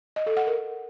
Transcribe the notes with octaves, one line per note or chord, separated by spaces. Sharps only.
D#5
A4
F#5
A#4